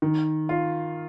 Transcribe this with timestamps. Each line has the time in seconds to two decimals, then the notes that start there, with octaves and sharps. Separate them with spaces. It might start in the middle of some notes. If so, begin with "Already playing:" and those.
0.02 D#3
0.49 F4